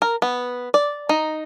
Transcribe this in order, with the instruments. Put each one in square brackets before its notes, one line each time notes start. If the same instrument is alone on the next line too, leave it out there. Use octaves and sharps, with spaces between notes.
[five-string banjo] A#4
B3
D5
D#4